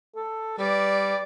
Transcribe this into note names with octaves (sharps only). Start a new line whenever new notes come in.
A4
G3 B4 D5